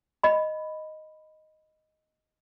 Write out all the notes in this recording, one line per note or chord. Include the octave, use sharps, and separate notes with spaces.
D#5 B5